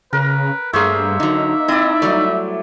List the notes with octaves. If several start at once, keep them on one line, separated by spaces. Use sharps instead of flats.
C#3 A#4 B4
G2 A3 A#3 G#4 C5 C#5 E5
D3 F#3 D#4
C4 E4 D5 D#5
F#3 G3 A3 D5